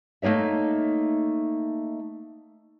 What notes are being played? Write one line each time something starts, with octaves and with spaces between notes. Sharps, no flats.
A3 A#3 D#4 C#5 E5